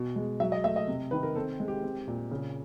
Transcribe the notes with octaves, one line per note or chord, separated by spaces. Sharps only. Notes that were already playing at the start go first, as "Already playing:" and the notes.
Already playing: B2
G#3
F#3 E5
D#5
A3 E5
D#5
C3
D#3 B4
A#4
C4 A4
G#3
G4
C4
A#2
C#3